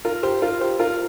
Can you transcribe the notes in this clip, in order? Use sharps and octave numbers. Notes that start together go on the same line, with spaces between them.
F4 A#4
G4 C5
F4 A#4
G4 C5
F4 A#4